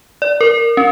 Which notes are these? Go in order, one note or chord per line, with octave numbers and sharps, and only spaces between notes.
D5
A#4
C#4